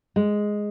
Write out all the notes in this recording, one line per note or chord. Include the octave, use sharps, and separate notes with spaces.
G#3